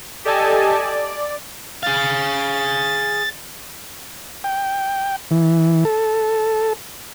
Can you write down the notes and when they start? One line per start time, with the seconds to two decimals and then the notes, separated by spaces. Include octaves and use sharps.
0.25 G4 A4 D5 D#5 G#5 A5
0.79 D5
1.83 G#4 F5 A6
4.44 G5
5.31 E3
5.85 A4